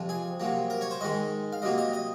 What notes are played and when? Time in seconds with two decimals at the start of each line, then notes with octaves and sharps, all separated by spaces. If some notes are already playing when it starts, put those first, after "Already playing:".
Already playing: F2 C3 F3
0.09 G#4
0.40 C3 F#3 A#3
0.70 A#4
0.81 C#5
0.91 C5
1.01 G#2 D#3 G#3 D#5
1.53 F5
1.62 C3 F#3 A#3 D#5
1.78 D#5
1.93 D#5